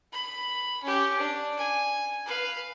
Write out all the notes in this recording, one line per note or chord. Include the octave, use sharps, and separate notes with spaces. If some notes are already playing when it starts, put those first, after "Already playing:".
B5
C#4 G4
D4
G#5
B4 F5